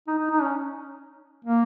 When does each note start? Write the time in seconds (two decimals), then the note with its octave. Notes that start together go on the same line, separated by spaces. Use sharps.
0.08 D#4
0.19 D#4
0.31 D#4
0.42 C#4
1.45 A#3